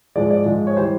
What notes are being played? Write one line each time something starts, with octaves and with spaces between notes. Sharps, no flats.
G#2 F3 G#3 D5
D5
G#2 F3 G#3
C#5
E3 G3 C5